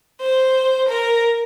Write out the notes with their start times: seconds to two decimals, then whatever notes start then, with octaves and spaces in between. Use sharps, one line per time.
0.21 C5
0.89 A#4